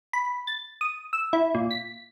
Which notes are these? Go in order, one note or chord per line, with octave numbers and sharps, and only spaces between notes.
B5
A6
D#6
E6
E4
A#2
B6